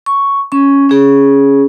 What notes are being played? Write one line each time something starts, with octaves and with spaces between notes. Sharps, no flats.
C#6
C#4 C#6
C#4 G#4